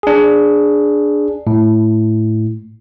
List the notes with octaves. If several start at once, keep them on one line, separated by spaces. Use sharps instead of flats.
D4 G#4
A2